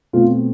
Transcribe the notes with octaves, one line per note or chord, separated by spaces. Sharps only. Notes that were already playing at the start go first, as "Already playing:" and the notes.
B2 A3 C4 F4